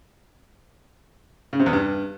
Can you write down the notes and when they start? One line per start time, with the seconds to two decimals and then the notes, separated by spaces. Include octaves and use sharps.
1.53 C#3
1.59 C3
1.66 E2
1.73 G2